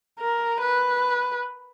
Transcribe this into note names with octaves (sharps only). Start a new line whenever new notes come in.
A#4
B4